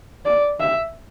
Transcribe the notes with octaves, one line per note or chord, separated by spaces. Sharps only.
D5
E5